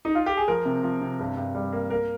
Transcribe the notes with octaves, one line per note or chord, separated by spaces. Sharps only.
D#4
F4
G4
G#4
F3 A#4
C3
F3
C3
G2
G2
G3
A#3
A#3 A#4